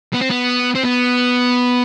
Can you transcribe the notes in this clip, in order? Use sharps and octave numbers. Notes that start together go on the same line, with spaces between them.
B3
C4
B3
C4
B3